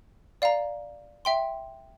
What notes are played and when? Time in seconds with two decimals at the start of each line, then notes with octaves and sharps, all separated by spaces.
0.42 D5 F5 A#5
1.25 E5 G5 C6